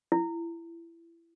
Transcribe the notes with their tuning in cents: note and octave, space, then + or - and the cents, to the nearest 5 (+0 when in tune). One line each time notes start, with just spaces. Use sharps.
E4 +25